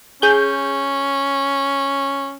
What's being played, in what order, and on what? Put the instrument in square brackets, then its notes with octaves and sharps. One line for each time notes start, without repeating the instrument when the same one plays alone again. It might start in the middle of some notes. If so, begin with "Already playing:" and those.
[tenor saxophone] C#4 [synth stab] G#4 G6